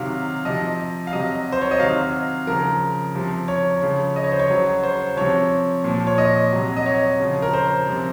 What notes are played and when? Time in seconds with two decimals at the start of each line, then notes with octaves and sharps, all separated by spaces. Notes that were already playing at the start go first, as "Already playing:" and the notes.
Already playing: C3 D#3 F#3 F5
0.45 C3 F3 D#5
1.07 F5
1.13 C3 F#3 D#5
1.52 C5
1.62 C#5
1.71 D#5
1.79 C3 D#3 F#3 F5
2.47 C#3 F3 A#4
3.15 C3 F3
3.48 C#5
3.82 C#3 F3
4.16 D#5
4.24 C#5
4.32 C5
4.39 C#5
4.50 C#3 F#3
4.84 C5
5.17 C3 F3 C#5
5.84 A#2 F3
6.07 C#5
6.18 D#5
6.53 C3 F#3
6.77 D#5
6.86 C#5
7.20 C#3 F3
7.42 A#4
7.53 C5
7.87 C3 F3